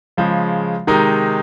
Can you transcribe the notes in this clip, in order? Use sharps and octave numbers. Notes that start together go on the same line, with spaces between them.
C#3 F3 G#3
C3 D#3 G#3 D#4 A#4